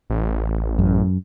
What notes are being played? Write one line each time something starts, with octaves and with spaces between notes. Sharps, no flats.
A1
F#2